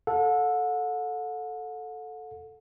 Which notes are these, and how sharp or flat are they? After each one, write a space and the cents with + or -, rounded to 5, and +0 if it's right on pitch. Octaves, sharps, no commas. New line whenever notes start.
A4 +0 F#5 -40